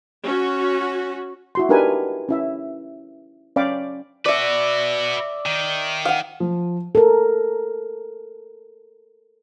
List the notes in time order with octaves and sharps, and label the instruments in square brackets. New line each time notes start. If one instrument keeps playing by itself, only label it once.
[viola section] C#4 F#4
[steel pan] E4 F#4 C6
D4 D#4 G4 A#4 B4 G#5
C#4 E4 E5
C#4 D5 F5 G5 B5 D6
[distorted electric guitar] F#4 B4 [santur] D5 E5
[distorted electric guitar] D#3
[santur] F5 F#5
[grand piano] F3
[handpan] A4 A#4